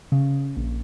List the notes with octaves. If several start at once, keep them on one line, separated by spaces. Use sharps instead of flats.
C#3
A#1